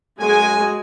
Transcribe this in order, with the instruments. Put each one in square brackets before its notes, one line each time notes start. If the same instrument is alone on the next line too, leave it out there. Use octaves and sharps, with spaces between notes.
[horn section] F#2 G#5 [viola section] G#3 F#4 G#4